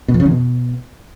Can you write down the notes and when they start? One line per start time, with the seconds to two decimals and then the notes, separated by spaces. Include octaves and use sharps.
0.08 B2
0.14 F2
0.20 C#3
0.25 E2
0.31 B2